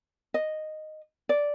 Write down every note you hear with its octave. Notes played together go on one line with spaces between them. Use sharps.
D#5
D5